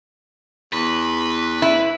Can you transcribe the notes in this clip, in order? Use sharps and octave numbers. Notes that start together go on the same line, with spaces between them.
E2 B4
E4